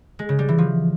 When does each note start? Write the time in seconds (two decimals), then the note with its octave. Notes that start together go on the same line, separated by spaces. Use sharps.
0.19 G#3
0.29 C#3
0.39 G3
0.49 E3
0.58 F3